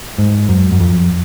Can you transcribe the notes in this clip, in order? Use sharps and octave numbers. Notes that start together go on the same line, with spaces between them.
G#2
F#2
F#2
F2